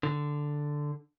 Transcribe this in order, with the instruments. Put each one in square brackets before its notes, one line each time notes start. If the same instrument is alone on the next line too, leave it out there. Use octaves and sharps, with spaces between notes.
[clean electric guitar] D3